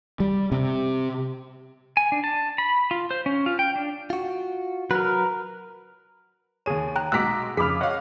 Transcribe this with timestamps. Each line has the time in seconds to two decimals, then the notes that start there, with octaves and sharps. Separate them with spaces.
0.20 G3
0.52 C3
1.97 G#5
2.12 D4
2.24 A5
2.58 B5
2.91 F4
3.11 C5
3.26 C#4
3.46 F4
3.59 G5
3.76 D4
4.10 F4 F#4
4.91 F#3 F#4 A#4 B4
6.66 D#2 G#4 C#5 D#7
6.96 G5 A#5 F#6
7.12 B1 G#3 F#5 A#5 D6 E6 F#6 B6
7.57 F2 C#3 G#4 B5 D6 F6 B6
7.81 C#5 D#5 F5 F#5